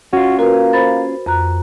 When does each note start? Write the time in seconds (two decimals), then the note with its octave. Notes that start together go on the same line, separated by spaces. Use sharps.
0.13 C#4 F4 F#4
0.39 A#3 F#4 A#4 B4
0.73 C5 B5 A6
1.26 F2 A#5 F#6